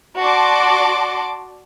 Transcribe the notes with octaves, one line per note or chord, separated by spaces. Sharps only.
F#4 D5 A5 C6 D6